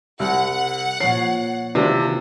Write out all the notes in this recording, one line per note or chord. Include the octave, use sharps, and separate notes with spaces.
C2 F#5
A#2 F3 C#5 C7
C3 D#3 E3 D4 F4